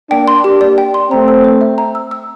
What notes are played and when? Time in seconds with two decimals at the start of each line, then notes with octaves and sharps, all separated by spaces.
0.10 A#3 D4 G5
0.28 C6
0.44 G4
0.61 D5
0.78 G5
0.94 C6
1.11 A3 C4 A#5
1.28 E6
1.44 C5
1.61 E5
1.78 A#5
1.95 E6
2.11 E6